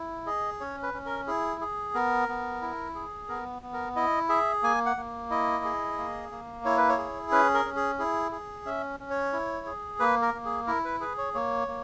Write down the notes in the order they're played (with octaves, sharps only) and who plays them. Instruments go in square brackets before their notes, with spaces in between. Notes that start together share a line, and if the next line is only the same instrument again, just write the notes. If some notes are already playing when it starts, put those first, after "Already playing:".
Already playing: [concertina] E4
G#4 D#5
C#4 C#5
B4
C#4
A#4
E4 G#4
G#4
B3 A#4
B3
E4
G#4
B3 A#4
B3
A#4
E4 D#5
G#4 E5
A#3 G#5
F#5
A#3
E4 D#5
G#4
A#3
A#3
E4 C#5
B4
C#5
G#4
C#4 B4
A#4
C#4
G#4
E4 G#4
G#4
C#4 E5
C#4
C#5
E4
G#4
A#3 B4
A#4
A#3
G#4
E4 A#4
B4
G#4 B4
C#5
A#3 C#5
A#3